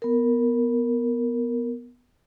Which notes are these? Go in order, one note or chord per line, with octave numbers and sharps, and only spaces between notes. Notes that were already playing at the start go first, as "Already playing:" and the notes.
B3 A#4